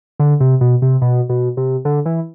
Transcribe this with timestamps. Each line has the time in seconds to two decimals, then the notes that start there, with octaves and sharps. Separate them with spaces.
0.20 D3
0.40 C3
0.61 B2
0.82 C3
1.02 B2
1.29 B2
1.57 C3
1.85 D3
2.06 E3